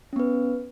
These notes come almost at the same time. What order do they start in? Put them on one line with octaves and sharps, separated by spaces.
C#4 B3 B4